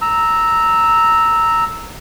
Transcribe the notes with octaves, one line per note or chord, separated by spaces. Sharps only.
A#5 E6